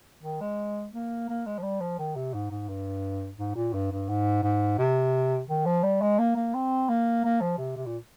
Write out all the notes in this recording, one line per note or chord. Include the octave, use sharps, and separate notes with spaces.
D#3
G#3
A#3
A#3
G#3
F3
G3
F3
D#3
C3
G#2
G#2
G2
G#2
A#2
G2
G2
G#2
G#2
C3
D#3
F3
G3
G#3
A#3
A#3
C4
A#3
A#3
F3
C3
C3
A#2